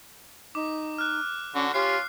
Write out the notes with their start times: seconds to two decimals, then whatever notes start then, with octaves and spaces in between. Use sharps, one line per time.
0.55 D#4 D6
0.98 F6 F#6
1.55 D3 C#4 F#4
1.74 C#4 F4 G4 C7